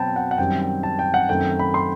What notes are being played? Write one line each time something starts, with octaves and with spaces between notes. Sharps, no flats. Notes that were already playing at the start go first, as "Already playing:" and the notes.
Already playing: B2 F#3 C4 G5 A5 B5
F#5
F#5
F#2 D#3 G3 C4 G5
G5
A5
G5
F#5
F#2 D#3 A3 C4 G5
B5
C6